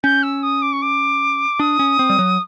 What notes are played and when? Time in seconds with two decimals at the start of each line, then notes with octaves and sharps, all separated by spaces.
0.04 C#4 G6
0.23 E6
0.43 D#6
0.62 D6
0.72 C#6
0.82 D6
1.59 D4 D#6
1.79 C#4
1.99 C4
2.10 G3
2.19 F#3